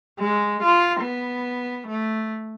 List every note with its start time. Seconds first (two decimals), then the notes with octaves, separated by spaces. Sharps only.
0.20 G#3
0.63 F4
1.02 B3
1.89 A3